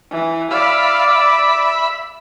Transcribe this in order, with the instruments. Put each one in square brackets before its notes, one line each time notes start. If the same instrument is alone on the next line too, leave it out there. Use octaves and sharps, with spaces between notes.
[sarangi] E3
[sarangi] D5 [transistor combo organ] E5 F5 B5
[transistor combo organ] E5 B5